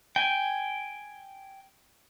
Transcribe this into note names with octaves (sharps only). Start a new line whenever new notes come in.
G5 G#5